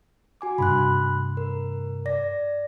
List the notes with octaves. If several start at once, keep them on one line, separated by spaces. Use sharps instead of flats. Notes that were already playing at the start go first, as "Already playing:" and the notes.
F#4 G#5 D6
G2 C3 B5 C6 F#6
A#4
D5 A#6